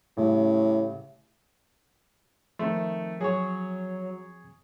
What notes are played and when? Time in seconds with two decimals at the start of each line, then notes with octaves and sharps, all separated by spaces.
0.17 A1 A2 C#3 G3
2.59 D#3 F3 A3 C4
3.21 F#3 G#4 C#5